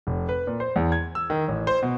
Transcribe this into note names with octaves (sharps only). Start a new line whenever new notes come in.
F1
B4
A#2
C5
E2
G#6
E6
D#3
A1
C5
B2